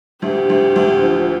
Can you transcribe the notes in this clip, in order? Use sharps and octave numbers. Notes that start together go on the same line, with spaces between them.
D2 G4
D2
D2
F3